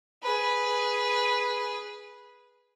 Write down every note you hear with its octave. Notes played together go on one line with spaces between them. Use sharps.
G#4 B4